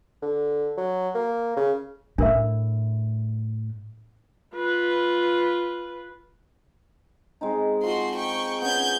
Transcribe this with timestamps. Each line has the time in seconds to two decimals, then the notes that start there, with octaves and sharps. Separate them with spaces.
0.22 D3
0.77 F#3
1.15 A#3
1.56 C#3
2.18 A2 D4 A#4 E5
4.55 F4 B4
7.41 G#3 C4 D#4
7.83 F3 F#4 C6
8.16 G5 C#6
8.62 B3 C#4 G6 G#6